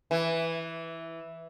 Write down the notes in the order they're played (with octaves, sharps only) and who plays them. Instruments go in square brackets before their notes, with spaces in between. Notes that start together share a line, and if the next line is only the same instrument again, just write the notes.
[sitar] E3